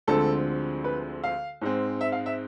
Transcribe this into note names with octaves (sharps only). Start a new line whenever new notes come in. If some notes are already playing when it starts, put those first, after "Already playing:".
D2 D3 F3 G#3 C4 A4
B4
F5
G#2 G#3 C4
E5
F5
E5